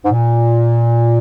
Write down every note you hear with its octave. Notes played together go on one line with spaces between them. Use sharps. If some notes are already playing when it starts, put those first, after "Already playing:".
G#2
A#2